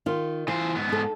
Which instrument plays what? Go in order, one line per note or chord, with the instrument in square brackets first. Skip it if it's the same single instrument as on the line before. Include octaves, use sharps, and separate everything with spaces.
[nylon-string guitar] D#3 F4
[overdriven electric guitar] E3 C5 [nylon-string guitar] F4
[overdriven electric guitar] G#2 B3
[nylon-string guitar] D#4 A4